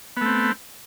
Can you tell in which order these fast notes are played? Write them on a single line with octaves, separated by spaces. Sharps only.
B3 A3 C4